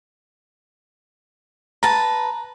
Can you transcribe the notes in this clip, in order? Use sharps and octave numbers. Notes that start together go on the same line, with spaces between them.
B4 A5 A#5